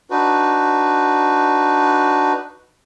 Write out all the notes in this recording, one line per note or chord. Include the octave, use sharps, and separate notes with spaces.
D4 D#4 F#4 B4